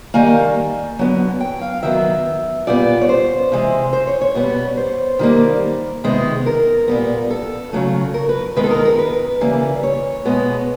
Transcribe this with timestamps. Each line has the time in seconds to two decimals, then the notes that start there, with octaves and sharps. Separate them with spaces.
0.14 D#3 G3 A#3 G#5
0.99 D3 F#3 B3
1.40 G5
1.61 F5
1.83 D#3 F#3 B3 E5
2.67 A#2 G3 B3 D5
3.01 C#5
3.09 C5
3.52 C3 E3 G#3
3.93 C5
4.07 C#5
4.21 C#5
4.35 B2 G3 B3
4.77 C5
5.19 D#3 G3 A#3
6.04 C3 D#3 G#3 B3
6.46 A#4
6.88 A#2 G3 B3
7.31 A4
7.73 C#3 F#3 A3
8.14 A#4
8.29 B4
8.56 D#3 G#3 B3 B4
8.64 A4
8.71 A#4
8.85 A#4
8.99 B4
9.41 C#3 E3 G3 A#3
9.83 C#5
10.25 B2 G#3 B3